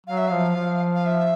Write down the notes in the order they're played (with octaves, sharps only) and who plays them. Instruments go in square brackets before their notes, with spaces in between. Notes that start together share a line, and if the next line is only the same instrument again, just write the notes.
[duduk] F#3 [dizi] F5
[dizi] E5
[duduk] F3 [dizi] F5
[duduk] F3
[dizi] F5
E5